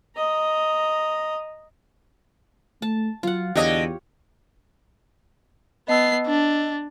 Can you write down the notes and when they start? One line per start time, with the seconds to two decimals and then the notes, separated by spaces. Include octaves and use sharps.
0.16 D#5 A#5
2.82 A3 A5
3.23 F#3 F4 F#5
3.55 E2 D3 G4 C#5 D#5
5.88 B3 D#5 A5 E6 C7
6.27 D4